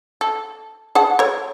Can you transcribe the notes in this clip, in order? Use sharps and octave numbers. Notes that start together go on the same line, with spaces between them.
A4
G#4 F#5 A5
A4 C#5